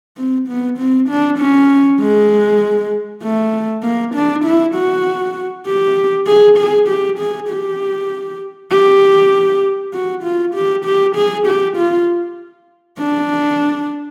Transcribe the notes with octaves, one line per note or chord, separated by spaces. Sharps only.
C4
B3
C4
D4
C#4
G#3
A3
A#3
D4
E4
F#4
G4
G#4
G#4
G4
G#4
G4
G4
F#4
F4
G4
G4
G#4
G4
F4
D4